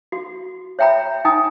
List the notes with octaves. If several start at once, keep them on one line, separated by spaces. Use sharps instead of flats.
F#4
C#5 E5 G5 A#5 B5
D#4 G5 G#5 A#5 D#6